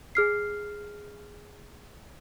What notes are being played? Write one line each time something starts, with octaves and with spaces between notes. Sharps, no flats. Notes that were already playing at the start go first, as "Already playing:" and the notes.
G#4 F6 C7